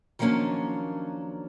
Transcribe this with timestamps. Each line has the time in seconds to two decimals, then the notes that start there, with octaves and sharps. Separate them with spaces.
0.19 D#3 F3 F#3 A#3 C#4 D4